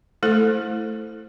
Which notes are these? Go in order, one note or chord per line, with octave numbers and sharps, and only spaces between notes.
A3 E4 A4 C5